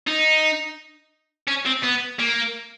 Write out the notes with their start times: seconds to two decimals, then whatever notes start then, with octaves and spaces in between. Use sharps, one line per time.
0.07 D#4
1.48 C#4
1.66 C4
1.84 B3
2.19 A#3